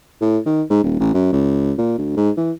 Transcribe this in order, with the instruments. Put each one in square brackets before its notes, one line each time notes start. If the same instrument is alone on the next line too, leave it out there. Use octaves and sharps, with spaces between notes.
[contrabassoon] A2
D#3
G#2
D#1
A1
F#2
C#2
A#2
D2
G#2
E3